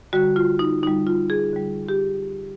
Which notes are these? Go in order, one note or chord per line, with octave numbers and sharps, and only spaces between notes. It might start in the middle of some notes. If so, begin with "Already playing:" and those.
D3 G3 F#4
F4
D#4
D3 G3 D#4
F4
G#4
D3 G3
G4